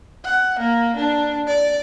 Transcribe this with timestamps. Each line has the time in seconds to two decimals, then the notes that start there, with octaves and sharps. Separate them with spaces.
0.25 F#5
0.59 A#3
0.96 D4
1.47 D5